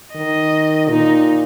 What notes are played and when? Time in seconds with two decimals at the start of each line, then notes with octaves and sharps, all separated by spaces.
0.15 D#3 D#5
0.90 A#2 D#4